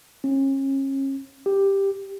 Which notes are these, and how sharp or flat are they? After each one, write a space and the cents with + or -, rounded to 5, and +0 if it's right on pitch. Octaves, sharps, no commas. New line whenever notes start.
C#4 -35
G4 +5